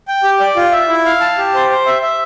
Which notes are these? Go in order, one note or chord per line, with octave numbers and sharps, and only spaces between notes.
G5
G4
D5
F4
E5
E4
F5
A5
G4
C5
C5
E5
E5